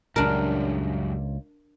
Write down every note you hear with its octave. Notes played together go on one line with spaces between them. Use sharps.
C#2 F#2 A#2 G3 D4 A#4